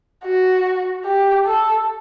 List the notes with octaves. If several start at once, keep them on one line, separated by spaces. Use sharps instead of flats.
F#4
G4
A4